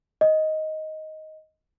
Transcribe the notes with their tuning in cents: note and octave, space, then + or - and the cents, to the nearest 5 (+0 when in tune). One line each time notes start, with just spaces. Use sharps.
D#5 +10